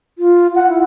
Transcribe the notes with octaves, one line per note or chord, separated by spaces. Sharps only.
F4
F#5
E4